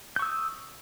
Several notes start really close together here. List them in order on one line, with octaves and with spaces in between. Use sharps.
G6 C#6 E6 D#6